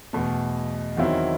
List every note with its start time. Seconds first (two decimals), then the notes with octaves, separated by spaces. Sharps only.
0.13 E2 B2 A3
0.97 E2 D#3 F#3 C4 E4